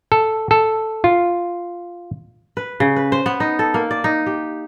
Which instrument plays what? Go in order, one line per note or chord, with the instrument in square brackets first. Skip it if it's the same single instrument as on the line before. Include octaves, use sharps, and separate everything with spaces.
[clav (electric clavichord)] A4
A4
F4
[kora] B4
C#3
B4
C5
B3
D#4
A4
A#3
D5
D#4
G4